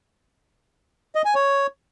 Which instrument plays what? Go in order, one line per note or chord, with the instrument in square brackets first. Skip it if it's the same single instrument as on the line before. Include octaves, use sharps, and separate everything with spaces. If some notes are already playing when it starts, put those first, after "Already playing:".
[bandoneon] D#5
G#5
C#5